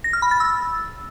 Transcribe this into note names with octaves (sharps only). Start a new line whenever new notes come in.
A#6
F6
B5
A6
E6